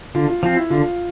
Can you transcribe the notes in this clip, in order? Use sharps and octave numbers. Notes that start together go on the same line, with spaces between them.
D3 F4
F4
F3 C4 F4
E4
D3 F4